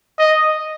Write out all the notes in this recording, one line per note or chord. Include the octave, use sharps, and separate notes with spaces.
D#5